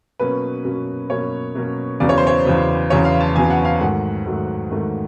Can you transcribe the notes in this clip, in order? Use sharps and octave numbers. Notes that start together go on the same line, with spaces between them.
B2 F#3 A#3 C#4 B4
B2 F#3 A#3 C#4
B2 F#3 A#3 C#4 C#5
B2 F#3 A#3 C#4
E2 C#3 F#3 B3 D5
C#5
C5
C#5
E2 C#3 F#3 B3
E2 C#3 F#3 B3 C#5
F5
A5
E2 C#3 F#3 B3 G#5
F#5
F5
G#2 D#3 F#3 A3 F#5
G#2 D#3 F#3 A3
G#2 D#3 F#3 A3